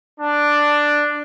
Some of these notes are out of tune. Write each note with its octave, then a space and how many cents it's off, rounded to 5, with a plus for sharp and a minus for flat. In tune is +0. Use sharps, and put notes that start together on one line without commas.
D4 +5